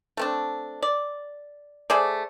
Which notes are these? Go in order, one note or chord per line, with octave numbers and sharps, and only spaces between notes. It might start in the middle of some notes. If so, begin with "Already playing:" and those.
A3 C4 D4
D5
A3 G#4 C5 D5